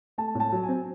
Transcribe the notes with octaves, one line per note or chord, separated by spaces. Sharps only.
A3 A5
A2
A5
F#3
C4 G#5